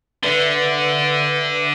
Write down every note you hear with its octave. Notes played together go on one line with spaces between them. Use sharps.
D3 B4 D5 E5